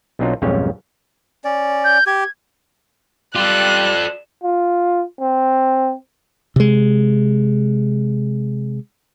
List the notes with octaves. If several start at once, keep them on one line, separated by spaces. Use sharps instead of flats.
B1 F#3 C4 D4 D#4 F4
B1 F2 G#2 G3 C#4 C#5
C#4 D5
G6
G4 G#6
G3 F4 G4 A4 D5 F#6
F4
C4
C3 G#3